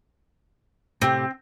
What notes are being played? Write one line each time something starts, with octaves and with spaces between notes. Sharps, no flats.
A2 C3 C4 G4